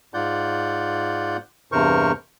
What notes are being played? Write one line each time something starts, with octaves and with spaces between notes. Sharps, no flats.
G#2 F4 D5 F#5 G6
E2 G2 C3 A#4 C5 C#6